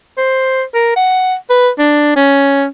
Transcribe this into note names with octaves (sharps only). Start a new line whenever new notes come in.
C5
A#4
F#5
B4
D4
C#4